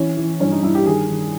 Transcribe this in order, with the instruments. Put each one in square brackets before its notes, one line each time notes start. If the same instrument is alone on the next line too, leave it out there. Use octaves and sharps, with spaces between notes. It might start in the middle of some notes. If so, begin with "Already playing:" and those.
Already playing: [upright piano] E3 C#4
E3
G2 C#4
D#4
G2 E4
G4
D#3 G#4
D#3